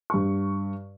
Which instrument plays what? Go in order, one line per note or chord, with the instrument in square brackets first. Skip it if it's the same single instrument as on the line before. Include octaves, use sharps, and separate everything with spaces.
[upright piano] G2 C#6